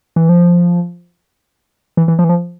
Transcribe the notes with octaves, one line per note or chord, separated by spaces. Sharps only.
E3
F3
E3
E3
F3
E3
F3